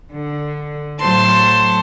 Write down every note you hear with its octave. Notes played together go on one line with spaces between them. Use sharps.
D3
A2 F#3 C5 A5 C6